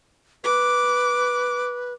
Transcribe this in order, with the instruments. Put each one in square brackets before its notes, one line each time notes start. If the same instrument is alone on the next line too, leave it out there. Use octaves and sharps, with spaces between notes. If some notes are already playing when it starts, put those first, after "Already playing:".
[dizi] B4 [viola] D6